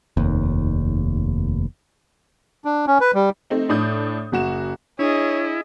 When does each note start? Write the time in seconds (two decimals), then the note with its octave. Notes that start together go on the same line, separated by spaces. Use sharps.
0.17 F1 D#2
2.65 D4
2.87 C#4
3.01 B4
3.15 G3
3.50 A3 C4 D#4
3.69 A2 D4 D#6 G6
4.32 F#1 F#4 E7
4.99 D4 E4 G#4 C#5 D#5